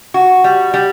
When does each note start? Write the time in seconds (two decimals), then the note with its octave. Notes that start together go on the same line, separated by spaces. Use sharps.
0.14 F#4
0.44 G3
0.74 G3